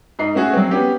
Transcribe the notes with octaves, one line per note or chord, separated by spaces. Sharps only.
G#2 D#5 C7
A3 C#4 F#4 G#4
F#3 C4
B3 C#4 G4